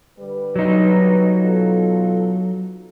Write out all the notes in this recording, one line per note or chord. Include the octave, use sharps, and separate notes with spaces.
D3 G3 B4
F#3 D#4
B2 F4 A4